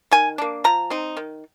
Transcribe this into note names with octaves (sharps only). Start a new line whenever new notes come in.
D#3 G#5
A#3 D4
F3 A#5
C4 D#4
D#3